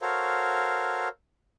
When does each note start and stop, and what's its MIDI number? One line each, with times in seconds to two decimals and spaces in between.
0.01 1.08 66
0.01 1.08 69
0.01 1.08 70
0.01 1.08 72
0.01 1.08 73
0.01 1.08 77